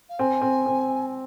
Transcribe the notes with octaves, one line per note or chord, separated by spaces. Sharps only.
F5
C4 G#5
C4
C4